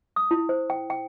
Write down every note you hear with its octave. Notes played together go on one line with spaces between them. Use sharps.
D#6
E4
C5
G5
G5